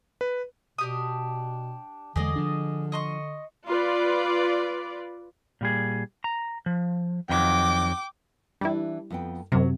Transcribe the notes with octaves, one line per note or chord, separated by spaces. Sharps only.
B4
B2 D4 G4 D#6
E2 D3 G#3 G#4 D5 D#5
F3 D4
D#5 C6 C#6
F4 B4 D5
A#2 G3 G#4
A#5
F3
F2 D#3 F#3 G5 D6
E3 G3 D4 E4
F2 B3 G5
F#2 C3 F#3